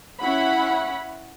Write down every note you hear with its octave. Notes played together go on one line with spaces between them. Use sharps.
C#4 E4 F#5 B5